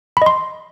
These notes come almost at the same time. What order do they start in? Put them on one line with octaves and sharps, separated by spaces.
B5 D#5 C6